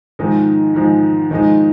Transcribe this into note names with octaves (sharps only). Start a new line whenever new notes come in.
G#2 D#3 F3 G#3
G#2 F3 G#3
G#2 D#3 F3 G#3